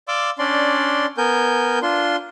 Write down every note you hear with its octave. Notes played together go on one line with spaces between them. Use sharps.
D5 F5 C6 D6 E6
C#4 D4 D5 C6
B3 A#4 G#5 G6
D4 F4 C6